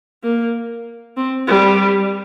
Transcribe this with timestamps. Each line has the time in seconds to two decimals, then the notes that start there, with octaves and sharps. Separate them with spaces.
0.23 A#3
1.17 C4
1.48 G3